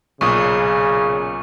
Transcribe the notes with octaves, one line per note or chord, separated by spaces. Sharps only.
B1 A#2 C#3 C#6 D#6